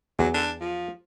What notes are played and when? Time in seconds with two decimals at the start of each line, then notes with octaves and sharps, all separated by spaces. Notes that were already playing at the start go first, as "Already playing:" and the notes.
0.19 E2 F#3
0.34 D4
0.61 F3